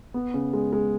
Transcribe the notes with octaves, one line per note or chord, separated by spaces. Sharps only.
B3
C#3
G#3
G#3